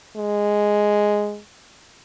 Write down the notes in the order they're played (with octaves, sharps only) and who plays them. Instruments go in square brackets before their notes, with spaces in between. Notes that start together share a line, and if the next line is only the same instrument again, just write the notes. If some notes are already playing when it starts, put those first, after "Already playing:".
[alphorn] G#3